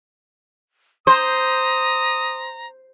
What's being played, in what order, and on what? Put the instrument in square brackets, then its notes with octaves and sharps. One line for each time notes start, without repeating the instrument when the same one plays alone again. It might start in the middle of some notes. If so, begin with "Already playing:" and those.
[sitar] C5 [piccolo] A#5 [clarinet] D#6